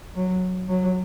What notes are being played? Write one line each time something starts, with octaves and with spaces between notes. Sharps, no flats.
F#3
F#3